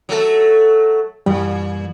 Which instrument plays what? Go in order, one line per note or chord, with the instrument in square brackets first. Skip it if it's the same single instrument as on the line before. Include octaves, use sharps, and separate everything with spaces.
[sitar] F#3 A3 A4
[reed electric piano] F#2 E3 G3 [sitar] A#2